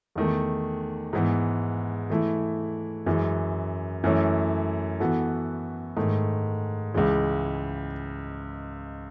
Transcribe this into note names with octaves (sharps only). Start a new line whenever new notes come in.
E2 D#3 A3
G#2 E3 B3
E3 A3 E4
F#2 E3 G#3
F#2 E3 A3 C#4 E4
E3 B3 F#4 A4
G#2 D#3 A3
C#2 C#3 E3 G#3